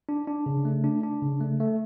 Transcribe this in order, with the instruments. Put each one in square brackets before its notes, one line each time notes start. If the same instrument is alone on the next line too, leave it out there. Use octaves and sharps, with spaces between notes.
[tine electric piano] D4
D4
C#3
A3
D4
D4
C#3
A3
A3